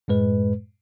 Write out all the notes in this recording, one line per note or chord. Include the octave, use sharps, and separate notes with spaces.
F#2 A2 G#3 B4